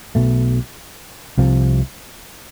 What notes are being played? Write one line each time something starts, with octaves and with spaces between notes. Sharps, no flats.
B1 B2 A3
C2 C3 F3